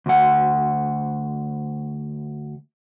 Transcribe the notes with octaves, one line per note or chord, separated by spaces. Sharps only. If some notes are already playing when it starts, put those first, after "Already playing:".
D2 F#5